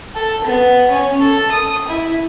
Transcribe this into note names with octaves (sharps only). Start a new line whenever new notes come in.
A4
B3
C#4
A4
D#6
E4